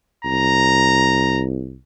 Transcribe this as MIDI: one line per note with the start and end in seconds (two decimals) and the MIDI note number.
0.25 1.76 36
0.25 1.43 82